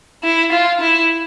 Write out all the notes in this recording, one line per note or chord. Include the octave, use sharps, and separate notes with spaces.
E4
F4
E4